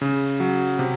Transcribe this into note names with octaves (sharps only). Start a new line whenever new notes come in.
C#3
F#3
C3